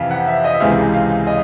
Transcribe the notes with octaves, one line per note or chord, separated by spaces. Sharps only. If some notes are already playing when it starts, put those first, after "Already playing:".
Already playing: F2 C3 E3 F5
F#5
E5
D#5
E5
C#2 C3 E3 G#3 F5
F5
D#5